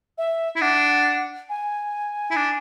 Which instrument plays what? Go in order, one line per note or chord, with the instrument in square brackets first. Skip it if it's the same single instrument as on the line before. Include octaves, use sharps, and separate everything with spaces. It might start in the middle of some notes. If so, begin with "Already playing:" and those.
[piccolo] E5
[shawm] E4
[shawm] D4 [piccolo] F#5
[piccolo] G#5
[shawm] E4
D4